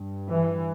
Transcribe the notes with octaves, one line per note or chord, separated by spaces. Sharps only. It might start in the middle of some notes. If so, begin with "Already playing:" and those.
Already playing: G2
E3